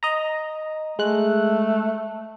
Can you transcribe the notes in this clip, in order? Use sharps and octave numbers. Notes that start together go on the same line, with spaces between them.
D#5 A#5
G#3 A3 F#6